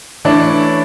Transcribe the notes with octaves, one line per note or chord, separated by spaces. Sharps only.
E3 A3 C#4 D4 E4